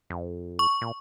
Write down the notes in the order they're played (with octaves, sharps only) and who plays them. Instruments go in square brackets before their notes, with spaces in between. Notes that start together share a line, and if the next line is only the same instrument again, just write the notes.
[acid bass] F2
[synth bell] C#6
[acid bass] A#2